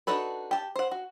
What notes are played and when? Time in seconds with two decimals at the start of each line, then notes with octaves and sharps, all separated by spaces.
0.07 D4 D#4 F#4 A4 B4
0.51 G4 A5
0.76 C5 F#5
0.91 F#4